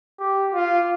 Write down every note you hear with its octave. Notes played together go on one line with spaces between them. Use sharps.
G4
F4